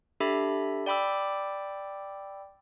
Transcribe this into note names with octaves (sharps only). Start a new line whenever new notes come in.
D4 G4 A4 E5 B5
D5 G5 B5 D6 E6